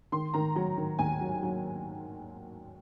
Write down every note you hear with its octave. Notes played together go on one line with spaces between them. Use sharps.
D#3 C6
D#3 A#5
F#3 A#5
D#3
D#2 G#5
F#3
F#3